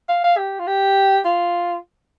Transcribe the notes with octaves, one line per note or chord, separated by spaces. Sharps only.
F5
F5
G4
F4
G4
F4